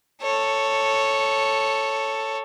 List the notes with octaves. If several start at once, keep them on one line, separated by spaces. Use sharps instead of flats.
A4 C#5